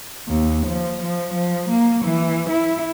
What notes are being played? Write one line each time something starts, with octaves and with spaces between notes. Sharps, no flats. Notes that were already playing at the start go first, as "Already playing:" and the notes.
D#2
F3
F3
F3
A#3
E3
E4